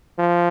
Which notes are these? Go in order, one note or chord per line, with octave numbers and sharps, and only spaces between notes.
F3